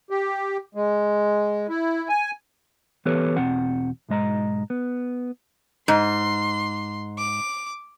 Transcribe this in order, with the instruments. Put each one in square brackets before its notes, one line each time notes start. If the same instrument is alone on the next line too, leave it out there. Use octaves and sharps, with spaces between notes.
[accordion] G4
G#3
E4
G#5
[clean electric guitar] E3 B3 G4 A4 B4 C#5
E2 B2 C4 F#5
B1 G#2 G#3 D#5 A#5
B3
[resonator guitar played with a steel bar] G#2 [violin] C6
[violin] D6